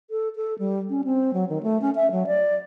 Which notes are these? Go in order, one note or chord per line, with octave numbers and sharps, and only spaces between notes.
A4
A4
G3
C#4
C4
F#3
D#3
A3
C#4
E5
F#3
D5